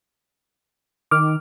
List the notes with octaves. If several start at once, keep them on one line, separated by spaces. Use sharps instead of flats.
D#3 D6 F6